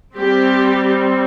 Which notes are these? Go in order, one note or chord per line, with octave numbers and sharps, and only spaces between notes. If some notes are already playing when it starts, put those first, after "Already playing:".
G3 C4 G4